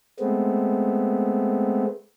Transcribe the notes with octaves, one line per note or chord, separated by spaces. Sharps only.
G#3 A3 B3 C4